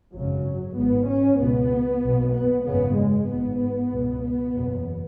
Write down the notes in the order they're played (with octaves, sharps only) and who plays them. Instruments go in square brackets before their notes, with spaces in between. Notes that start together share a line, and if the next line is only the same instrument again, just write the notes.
[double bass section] G#1 F#2 C#3 F#3
G#1 G#2 B3
C#4
C#2 B2 B3
B1 B2
B3
G#1 F#2 C#3 B3
G#3
G#1 G#2 B3
C#2 B2
B3
F#1 E2 B2